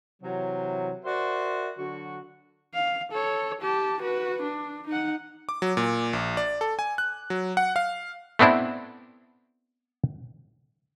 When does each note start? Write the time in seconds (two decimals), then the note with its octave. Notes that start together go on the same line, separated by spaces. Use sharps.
0.23 C3 E3 F#3
1.05 F#4 A#4 C5 D5 E5
1.78 D3 F#3 F#4
2.74 F5
3.12 A4 C#5
3.61 G4 A5
4.01 F#4 B4
4.42 D4
4.88 D#4 F#5
5.49 D6
5.62 F#3
5.77 A#2
6.13 A#1
6.37 D5
6.61 A4
6.79 G#5
6.98 F#6
7.30 F#3
7.57 F#5
7.76 F5
8.39 A3 B3 C4 D4 E4